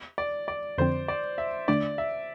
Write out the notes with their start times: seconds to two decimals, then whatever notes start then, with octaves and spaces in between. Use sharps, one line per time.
0.18 D5
0.48 D5
0.78 F2 D3 F3 C4 C5
1.08 D5
1.38 E5
1.68 D3 A3 D4 D5
1.98 E5